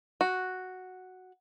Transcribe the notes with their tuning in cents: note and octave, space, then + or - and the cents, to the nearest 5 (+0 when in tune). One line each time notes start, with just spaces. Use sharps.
F#4 +0